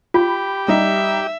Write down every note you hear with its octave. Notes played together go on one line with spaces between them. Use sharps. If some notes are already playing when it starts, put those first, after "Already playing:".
F4 G4 B5
G3 D#4 E5